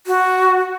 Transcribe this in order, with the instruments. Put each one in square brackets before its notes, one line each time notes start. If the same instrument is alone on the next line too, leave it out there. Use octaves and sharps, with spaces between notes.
[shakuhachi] F#4